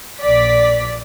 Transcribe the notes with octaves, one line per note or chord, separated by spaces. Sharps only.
A#1 D5 B6